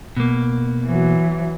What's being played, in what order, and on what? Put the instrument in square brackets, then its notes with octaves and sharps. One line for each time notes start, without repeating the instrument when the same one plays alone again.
[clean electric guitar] B2 A#3
[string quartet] E3 F#3